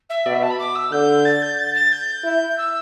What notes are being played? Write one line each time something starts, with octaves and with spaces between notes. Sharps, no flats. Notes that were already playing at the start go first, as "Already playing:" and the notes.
E5
B2 D5
E5
A5
B5
D6
E6
D3 G6
A6
G6
A6
A6
G6
E4
E6